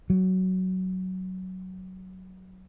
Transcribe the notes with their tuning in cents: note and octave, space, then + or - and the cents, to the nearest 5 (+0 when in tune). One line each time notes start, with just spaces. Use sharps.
F#3 +10